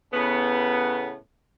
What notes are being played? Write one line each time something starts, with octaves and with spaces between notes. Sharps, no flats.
A2 C#3 B3